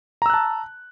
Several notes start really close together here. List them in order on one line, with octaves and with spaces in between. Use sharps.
A#5 E6 F#6 A5